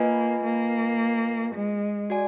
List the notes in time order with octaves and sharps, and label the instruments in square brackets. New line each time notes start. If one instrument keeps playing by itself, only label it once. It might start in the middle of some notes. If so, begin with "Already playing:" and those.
Already playing: [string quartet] A#3 [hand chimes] F4 B4 D#5 G#5
[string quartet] A#3
G#3
[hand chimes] F#4 D5 G#5